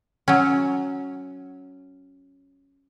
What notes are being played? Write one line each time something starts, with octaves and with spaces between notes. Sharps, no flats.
F#3 C#4